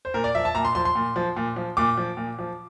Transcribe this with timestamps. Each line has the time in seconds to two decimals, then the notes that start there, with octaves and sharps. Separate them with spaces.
0.05 C5
0.14 A#2 A#4
0.24 D5
0.35 F3 E5
0.45 A5
0.55 A#2 A#5
0.65 C6
0.75 F3 C6
0.85 C6
0.95 A#2
1.16 F3
1.36 A#2
1.56 F3
1.77 A#2 D6
1.98 F3
2.17 A#2
2.39 F3